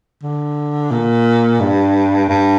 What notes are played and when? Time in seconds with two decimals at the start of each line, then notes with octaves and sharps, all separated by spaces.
0.23 D3
0.91 A#2
1.60 G2
2.29 G2